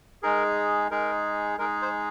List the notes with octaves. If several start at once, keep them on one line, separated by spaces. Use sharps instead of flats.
G#3 D#4 G#4 A#4
G#3 D#4 G#4 A#4
G#3 D#4 G#4 A#4
C5